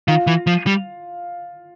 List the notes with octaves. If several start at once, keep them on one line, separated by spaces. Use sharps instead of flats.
D#3 F4 F5
E3
F3
G3